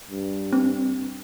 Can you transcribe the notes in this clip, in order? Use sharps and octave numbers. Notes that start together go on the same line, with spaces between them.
G2
G2 C4